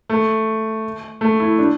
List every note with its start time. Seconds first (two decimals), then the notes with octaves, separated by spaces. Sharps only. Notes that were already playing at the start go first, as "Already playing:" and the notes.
0.10 A3
1.21 A3
1.40 E4
1.59 D4